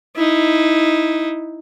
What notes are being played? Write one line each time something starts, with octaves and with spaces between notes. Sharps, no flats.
D#4 E4